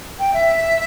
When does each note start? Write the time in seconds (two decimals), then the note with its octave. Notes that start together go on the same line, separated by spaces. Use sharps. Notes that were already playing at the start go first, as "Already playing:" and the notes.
0.19 G5
0.34 E5